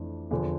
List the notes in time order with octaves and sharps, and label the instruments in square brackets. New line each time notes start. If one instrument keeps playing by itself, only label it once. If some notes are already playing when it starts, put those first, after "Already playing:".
Already playing: [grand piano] F2 E3 A3 D4
E2 D3 F3